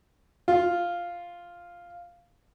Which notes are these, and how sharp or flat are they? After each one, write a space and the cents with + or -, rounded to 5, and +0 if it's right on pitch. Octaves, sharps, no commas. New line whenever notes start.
F4 -5